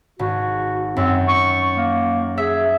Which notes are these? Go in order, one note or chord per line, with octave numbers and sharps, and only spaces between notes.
G#1 F#4
F#2 C4
C#6
A#3
G#4 E5